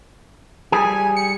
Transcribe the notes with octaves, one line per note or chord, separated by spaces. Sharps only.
G3 G4 G#4 G#5
C#7